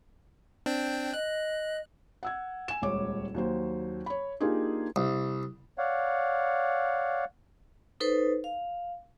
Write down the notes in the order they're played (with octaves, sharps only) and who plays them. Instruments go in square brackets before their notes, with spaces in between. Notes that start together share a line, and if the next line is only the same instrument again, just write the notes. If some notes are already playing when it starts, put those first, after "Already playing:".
[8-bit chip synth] C4 D4 G5
[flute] D#5 [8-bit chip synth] F#6
[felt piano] F#5 E6 G#6
G#5 E7
D#1 C#2 C#5 D6
D#2 F#3 C5
C#5 B5
A#3 D4 D#4 F4 G4 G#4
[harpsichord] C2
[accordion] C#5 D5 F5 F#5
[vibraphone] D#4 A4 B4 C5
F5